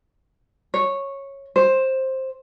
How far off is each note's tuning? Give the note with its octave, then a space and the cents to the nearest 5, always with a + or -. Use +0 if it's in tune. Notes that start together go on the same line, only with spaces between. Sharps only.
C#5 -10
C5 +10